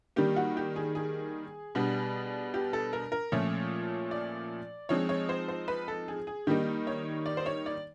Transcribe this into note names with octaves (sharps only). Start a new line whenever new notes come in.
D#3 G3 A#3 G4
F#4
G4
G#4
G#4
B2 G3 B3 D4
G4
A4
A#4
A#4
A#2 F3 A3 C#4 C#5
D5
F3 G#3 C4 D#4 C#5
C#5
C5
C5
B4
A4
G#4
G#4
D#3 G3 A#3 D#4 G4
C#5
D5
C5
C#5
D5